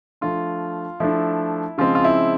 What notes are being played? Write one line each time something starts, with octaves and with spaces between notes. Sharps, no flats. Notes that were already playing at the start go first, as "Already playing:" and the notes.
F3 A3 D4 F4
F3 A3 D4 E4
C#3 F3 G#3 C4 F4
F4
E4